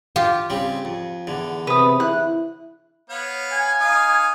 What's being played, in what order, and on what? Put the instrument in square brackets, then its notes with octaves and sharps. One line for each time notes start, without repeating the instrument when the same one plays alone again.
[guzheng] F4 G4
[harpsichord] C#3 G3 C4
F2
E2 D3
[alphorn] C3 [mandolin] B4 D#6
[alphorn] E4 [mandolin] F#6
[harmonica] B3 C#5 F5
[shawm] G#5
[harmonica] D#4 F5 D#6